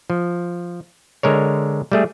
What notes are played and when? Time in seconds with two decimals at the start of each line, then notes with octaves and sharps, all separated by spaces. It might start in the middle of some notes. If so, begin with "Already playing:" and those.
0.10 F3
1.23 D3 G#3 A#4 C#5
1.92 G3 A3 G#4